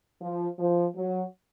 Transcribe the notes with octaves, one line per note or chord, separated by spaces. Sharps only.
F3
F3
F#3